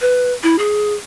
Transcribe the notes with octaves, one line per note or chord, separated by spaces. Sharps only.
B4
E4
G#4